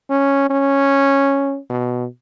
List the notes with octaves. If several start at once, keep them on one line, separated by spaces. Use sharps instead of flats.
C#4
C#4
B2